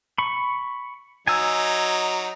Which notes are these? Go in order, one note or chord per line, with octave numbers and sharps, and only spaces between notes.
B5 C#6
F#3 D#4 G#5 E6